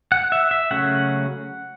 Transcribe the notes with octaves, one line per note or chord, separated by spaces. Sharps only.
F#5
E5
E5
C#3 F#3 A3 C#4 F#5